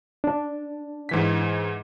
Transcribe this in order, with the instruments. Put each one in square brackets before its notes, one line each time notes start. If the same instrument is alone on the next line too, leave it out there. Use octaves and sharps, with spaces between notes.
[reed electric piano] D4
[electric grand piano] G#2 E3 B6